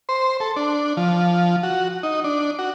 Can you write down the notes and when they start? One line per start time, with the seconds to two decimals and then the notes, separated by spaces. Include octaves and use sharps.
0.09 C5
0.40 A4
0.56 D4
0.97 F3
1.63 F#4
2.03 D#4
2.24 D4
2.59 F#4